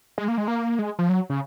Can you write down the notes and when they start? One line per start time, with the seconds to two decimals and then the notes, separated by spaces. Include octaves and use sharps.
0.18 G#3
0.28 A#3
0.38 G#3
0.48 A#3
0.79 G#3
0.99 F3
1.09 F#3
1.30 C#3